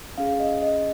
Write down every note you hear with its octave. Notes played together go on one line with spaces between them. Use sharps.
C#4 G#4 F5
D#5
D#5